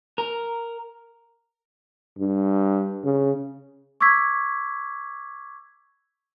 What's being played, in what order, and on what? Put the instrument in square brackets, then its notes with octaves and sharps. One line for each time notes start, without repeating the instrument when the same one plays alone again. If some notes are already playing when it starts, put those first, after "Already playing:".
[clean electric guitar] A#4
[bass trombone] G2
C#3
[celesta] C#6 D6 E6 G#6 B6